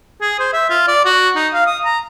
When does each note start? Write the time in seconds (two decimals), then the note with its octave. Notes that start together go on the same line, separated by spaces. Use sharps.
0.21 G#4
0.39 C5
0.53 E5
0.69 F4
0.88 D5
1.05 F#4
1.35 D#4
1.53 F5
1.66 D#6
1.84 A#5